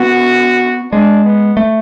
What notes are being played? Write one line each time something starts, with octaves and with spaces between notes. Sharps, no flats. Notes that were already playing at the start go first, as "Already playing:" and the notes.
Already playing: B3 F#4
G#3 D4
B3
A3